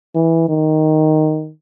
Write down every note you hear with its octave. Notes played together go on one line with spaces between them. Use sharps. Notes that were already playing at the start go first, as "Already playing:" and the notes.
E3
D#3